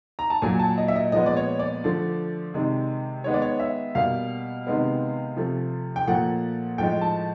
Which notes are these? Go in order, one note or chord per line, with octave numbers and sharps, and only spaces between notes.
A#5
A5
A#2 F#3 A#3 G#5
A5
D#5
E5
D#5
A#2 F3 G#3 B3 D#5
D5
C#5
D5
D3 F3 A3
C3 D#3 G#3
D#3 G#3 B3 C#5
D5
C#5
E5
B2 G3 A#3 F5
C3 D#3 G#3 B3
C3 F3 A3
G5
A#2 F3 A3 F#5
A2 F3 G#3 G5
A5